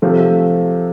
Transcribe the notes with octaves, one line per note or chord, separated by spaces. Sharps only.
C3 F3 A3